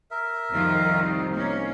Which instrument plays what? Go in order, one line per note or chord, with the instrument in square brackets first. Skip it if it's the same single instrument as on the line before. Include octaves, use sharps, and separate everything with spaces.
[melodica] A#4 E5
[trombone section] C2 D#4 [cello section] F2 D#3 F4
[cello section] A#3 C#4 [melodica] A#4